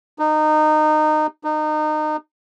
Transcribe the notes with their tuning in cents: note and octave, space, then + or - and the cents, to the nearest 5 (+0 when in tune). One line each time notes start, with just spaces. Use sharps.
D#4 -20
D#4 -25